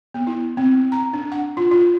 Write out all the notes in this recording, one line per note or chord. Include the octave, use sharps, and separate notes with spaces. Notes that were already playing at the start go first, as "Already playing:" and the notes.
B3
E4
C4
A#5
D4
F#5
F4
F4